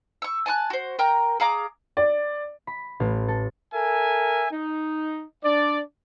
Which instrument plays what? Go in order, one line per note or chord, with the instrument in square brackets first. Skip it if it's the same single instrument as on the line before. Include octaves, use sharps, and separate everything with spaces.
[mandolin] C#6 E6
G#5 A5 D6 F#6
F#4 C5
A#4 G5 A#5
G#4 F5 A#5 D6
[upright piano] D5
[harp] B5
A1
A4
[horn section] A4 A#4 E5 G#5
D#4
D4 D5